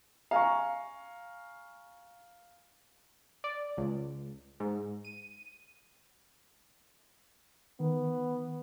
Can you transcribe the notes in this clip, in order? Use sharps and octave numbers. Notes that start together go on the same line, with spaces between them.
F5 G#5 A#5 C#6
D5
C#2
G#2
D#7
D#3 B3